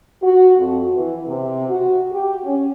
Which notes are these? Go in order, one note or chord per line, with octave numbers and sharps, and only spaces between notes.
F#4
F2
E3
C3
F#4
G4
C#4